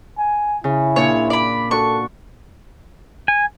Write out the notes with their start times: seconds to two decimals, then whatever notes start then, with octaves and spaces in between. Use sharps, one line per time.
0.18 G#5
0.64 C#3 E4
0.96 A#2 D4 C#5
1.30 D5 B5
1.71 D4 F#4 A4 C#6
3.28 G#5